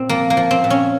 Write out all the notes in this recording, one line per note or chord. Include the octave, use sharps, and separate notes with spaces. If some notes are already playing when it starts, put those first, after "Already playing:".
Already playing: A#2 C4
F3 A#3
A#3
F3
C4
A#2
C#4